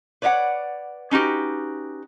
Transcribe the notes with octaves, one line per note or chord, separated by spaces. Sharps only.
B4 C#5 D5 E5 F#5
C#4 D#4 F#4 G4 B4